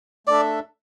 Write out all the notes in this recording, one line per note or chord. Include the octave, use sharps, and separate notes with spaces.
A3 D4 A4 D5 E5